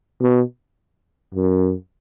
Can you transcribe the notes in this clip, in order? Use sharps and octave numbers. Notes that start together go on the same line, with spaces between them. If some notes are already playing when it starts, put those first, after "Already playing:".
B2
F#2